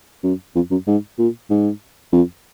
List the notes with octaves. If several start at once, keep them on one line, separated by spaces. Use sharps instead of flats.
F#2
F2
F#2
G#2
A#2
G#2
F2